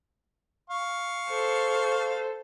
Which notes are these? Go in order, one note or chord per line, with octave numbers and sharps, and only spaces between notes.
F5 C#6
A4 C5